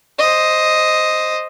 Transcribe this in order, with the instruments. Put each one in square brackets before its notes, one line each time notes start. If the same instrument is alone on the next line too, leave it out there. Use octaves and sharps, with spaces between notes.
[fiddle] C5 D#5